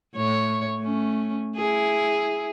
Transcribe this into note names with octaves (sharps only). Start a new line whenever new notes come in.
A2 C#5
A3 C#4
E4 G#4